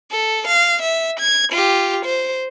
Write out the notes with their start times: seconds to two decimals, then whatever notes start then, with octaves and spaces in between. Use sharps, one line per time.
0.11 A4
0.47 F5
0.81 E5
1.20 G#6
1.52 F4 G4
2.05 C5